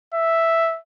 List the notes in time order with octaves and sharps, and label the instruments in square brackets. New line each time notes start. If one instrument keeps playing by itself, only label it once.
[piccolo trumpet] E5